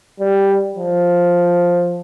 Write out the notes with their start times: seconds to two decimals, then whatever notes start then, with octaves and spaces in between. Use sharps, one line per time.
0.20 G3
0.76 F3